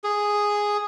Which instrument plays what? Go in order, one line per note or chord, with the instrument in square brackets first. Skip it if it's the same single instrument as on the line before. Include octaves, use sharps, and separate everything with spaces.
[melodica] G#4